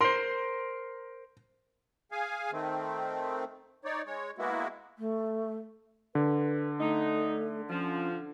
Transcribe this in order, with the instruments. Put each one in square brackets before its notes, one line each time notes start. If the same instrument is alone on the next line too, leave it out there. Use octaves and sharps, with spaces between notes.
[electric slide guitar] A#4 C5 [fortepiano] C6
[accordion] G#4 F5 G#5
D#3 A3 C4
D#4 C#5 D5
G#3 C#5
G#3 A#3 B3 E4 F#4
[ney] A3
[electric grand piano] D3 [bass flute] B4
[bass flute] A3 [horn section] D#4
[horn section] F3 [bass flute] C#4